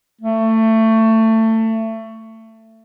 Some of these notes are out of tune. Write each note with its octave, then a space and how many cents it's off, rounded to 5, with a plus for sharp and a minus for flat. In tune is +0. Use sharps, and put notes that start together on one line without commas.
A3 +20